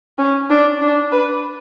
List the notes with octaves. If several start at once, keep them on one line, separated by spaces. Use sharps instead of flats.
C#4
D4
D4
B4